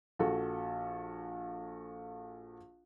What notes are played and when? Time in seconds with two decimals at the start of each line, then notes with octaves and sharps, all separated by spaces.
0.19 A#1 F#4 A4